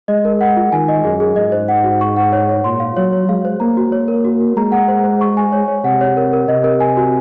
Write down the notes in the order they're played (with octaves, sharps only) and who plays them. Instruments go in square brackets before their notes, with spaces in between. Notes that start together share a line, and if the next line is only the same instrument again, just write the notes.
[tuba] G#3 [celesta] D#5
[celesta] A#4
F#5
F4
[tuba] D#3 [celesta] G#5
[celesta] D#5
[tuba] F#2 [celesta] G#4
[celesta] G#4
[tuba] G#2 [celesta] D#5
[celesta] C5
F#5
F#4
C#6
F#5
C#5
C#5
[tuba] A#2 [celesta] C6
[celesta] F5
[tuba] F#3 [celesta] C#5
[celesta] C#5
[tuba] G#3 [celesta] F5
[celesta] C5
[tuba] A#3 [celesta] A#5
[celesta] F#4
C#5
A#4
F#4
F#4
[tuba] G#3 [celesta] A#5
[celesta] F#5
C5
C5
C#6
G#5
C#5
C#5
[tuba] C3 [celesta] F#5
[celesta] C#5
A#4
A#4
[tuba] C3 [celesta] D#5
[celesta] A#4
G#5
F#4